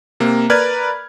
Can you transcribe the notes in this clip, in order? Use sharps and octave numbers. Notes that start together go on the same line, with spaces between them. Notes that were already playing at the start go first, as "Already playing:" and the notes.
C3 A#3
A#4 B4 D5 B5 F6 G#6